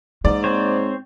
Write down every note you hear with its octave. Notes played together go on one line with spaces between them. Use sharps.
G#2 A#3 D5
C4 C5 C#5